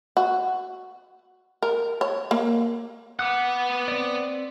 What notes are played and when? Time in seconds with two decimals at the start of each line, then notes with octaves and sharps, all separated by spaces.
0.17 F#4
1.63 A#4
2.01 C#5
2.31 A#3
3.19 B3 F#5 D6 D#6 F#6
3.88 C4 D5